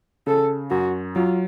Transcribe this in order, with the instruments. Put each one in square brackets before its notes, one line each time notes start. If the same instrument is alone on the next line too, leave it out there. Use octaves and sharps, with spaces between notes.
[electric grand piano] C#3 [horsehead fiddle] A4
[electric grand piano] F#2 [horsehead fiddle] F#4
[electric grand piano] F#3 [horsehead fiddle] F4